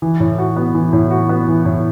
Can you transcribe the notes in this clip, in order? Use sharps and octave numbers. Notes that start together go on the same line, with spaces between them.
E3
A2
F#4
B3
E3
A2
F#4
B3
E3
A2